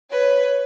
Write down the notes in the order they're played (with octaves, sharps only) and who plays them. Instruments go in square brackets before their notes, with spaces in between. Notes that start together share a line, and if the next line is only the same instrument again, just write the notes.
[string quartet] B4 C#5